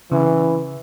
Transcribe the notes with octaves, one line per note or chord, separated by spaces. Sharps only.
C#3 E3